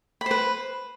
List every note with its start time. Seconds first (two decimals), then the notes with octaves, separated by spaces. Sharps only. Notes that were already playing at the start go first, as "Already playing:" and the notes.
0.21 B5
0.26 C5
0.31 B4